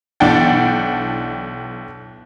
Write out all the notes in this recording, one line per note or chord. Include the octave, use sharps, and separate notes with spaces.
B1 E3 D4 F#5 G5 A6